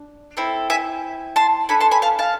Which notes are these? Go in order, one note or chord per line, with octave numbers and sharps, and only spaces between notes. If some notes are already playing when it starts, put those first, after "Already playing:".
Already playing: D4
C4 E4 A4
E5 G#5
A5 C6
D4 A4 G#5 B5
A5 C6
G#5 B5
F5 A5
F5 A5